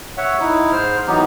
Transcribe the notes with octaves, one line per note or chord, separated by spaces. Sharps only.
C#5 E5 F#5
D#4 E4
G#2 C5 F6
E3 F#3 B3 D#4 G4